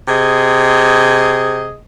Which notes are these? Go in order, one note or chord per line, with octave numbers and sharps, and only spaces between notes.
C3 G#4 D#5